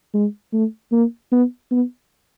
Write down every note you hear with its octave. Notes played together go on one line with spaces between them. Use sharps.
G#3
A3
A#3
B3
B3